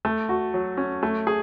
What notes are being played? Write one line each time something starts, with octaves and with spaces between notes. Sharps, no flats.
A3
F#4
F#3
C#4
A3
G#4